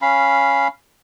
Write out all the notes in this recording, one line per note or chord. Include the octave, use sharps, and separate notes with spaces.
C#4 F5 B5